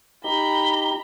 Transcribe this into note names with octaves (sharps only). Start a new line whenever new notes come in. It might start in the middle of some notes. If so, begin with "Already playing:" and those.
D#4 G4 A#5 B5 G7